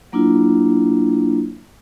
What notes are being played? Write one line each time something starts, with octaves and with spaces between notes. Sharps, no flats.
F#3 A#3 D4 E4 F4